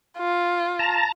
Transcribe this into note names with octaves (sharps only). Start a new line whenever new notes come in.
F4
A5 A#5